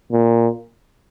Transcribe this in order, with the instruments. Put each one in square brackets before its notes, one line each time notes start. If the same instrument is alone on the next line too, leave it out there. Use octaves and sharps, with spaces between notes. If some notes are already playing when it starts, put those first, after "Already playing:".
[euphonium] A#2